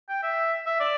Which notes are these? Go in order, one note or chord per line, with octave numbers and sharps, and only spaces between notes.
G5
E5
E5
D5